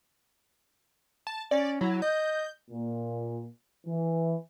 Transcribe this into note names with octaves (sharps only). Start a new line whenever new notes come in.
A5
C#4 D5
F#3 E4
D#5 G6
A#2
E3